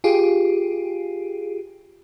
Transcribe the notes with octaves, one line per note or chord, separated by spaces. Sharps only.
F4 G4 G#4